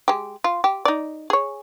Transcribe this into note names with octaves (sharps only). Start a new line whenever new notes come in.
G#3 G4
F4
G4
D#4 D5
G#4 C#5